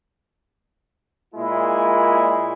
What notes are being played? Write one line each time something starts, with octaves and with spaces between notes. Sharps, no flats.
A#2 G#3 E4